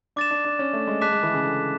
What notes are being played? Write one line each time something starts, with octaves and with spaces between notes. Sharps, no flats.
D4 D6 A6 E7
D4
D4
C#4
A3
G#3
G#3 A5 D6 F#6 B6 E7
G#3
E3
C#3
D3